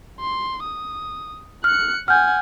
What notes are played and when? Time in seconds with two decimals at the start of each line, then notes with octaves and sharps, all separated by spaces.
0.20 C6
0.63 D#6
1.64 F6 F#6 C#7
2.08 F#5 G#5 F6 G6